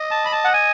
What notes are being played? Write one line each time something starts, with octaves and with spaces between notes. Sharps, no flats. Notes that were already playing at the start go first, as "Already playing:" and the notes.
Already playing: D#5
A5
B5
A5
F#5
G#5